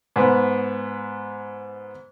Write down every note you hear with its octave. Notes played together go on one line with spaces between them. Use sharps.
G#2 B3